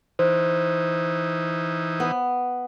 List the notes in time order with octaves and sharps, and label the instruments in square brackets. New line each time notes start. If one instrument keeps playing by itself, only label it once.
[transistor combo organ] E3 D#4 [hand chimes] C5
[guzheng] B3